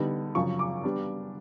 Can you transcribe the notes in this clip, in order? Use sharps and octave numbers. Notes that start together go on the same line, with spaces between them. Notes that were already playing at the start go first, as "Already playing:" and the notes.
Already playing: D3 G3 B3 D#4
F#2 C#3 F3 C#6
D6
G3 B3 D4